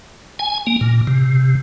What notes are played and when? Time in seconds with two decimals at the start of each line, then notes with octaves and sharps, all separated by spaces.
0.39 G#5
0.67 A#3
0.81 A#2
1.07 C3